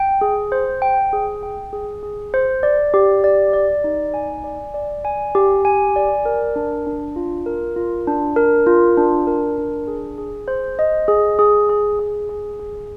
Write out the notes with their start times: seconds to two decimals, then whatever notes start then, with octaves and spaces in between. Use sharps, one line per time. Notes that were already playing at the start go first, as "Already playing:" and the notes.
Already playing: G5
0.21 G#4
0.52 C5
0.82 G5
1.13 G#4
1.43 G5
1.73 G#4
2.03 G#4
2.34 C5
2.63 D5
2.94 G4
3.24 D5
3.53 D5
3.84 D#4
4.14 G#5
4.44 D5
4.74 D5
5.05 G#5
5.35 G4
5.65 G#5
5.96 D5
6.25 A#4
6.56 D4
6.87 D4
7.16 F4
7.46 A#4
7.76 F4
8.07 D4
8.36 A#4
8.67 F4
8.97 D4
9.27 A#4
9.58 D4
9.88 G#4
10.18 G#4
10.48 C5
10.79 D#5
11.08 G#4
11.39 G#4
11.69 G#4
11.99 G#4
12.29 G#4
12.60 G#4